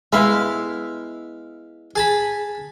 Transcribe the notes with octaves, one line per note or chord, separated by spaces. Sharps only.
G#3 B3 E4 E5 F5
G#4 A5 B5